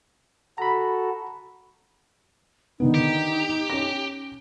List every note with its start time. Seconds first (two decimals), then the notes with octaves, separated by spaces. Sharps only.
0.58 F#4 A4 A#5 B5
2.80 D3 D#3 B3 D#4
2.94 G4
3.70 C#4 A#6